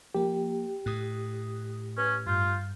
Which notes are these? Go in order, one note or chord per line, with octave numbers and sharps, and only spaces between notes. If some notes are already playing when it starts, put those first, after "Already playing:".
F3 A#3 G4
A2 D#6 F#6
C#4 B4
G2 F4 G6